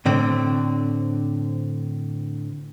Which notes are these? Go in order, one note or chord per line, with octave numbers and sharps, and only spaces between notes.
A2 D3 C4